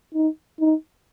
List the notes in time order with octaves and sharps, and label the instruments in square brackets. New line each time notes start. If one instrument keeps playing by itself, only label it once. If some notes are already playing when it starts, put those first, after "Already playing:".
[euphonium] D#4
D#4